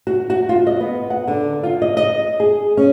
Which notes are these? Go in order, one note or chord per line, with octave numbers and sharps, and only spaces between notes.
F#4
F#4
F4
D#5
B3
F#5
D3
F4
D#5
D#5
G#4
C#4